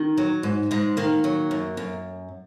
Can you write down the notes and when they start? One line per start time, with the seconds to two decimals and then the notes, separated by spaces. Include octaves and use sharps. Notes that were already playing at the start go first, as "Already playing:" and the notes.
Already playing: D#3
0.17 F#3
0.43 G#2
0.71 G#2 G#3
0.97 D#3 A#3
1.24 F#3
1.51 F#2
1.77 F#2